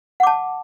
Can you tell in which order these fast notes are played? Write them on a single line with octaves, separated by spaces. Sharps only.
F#5 D6 A5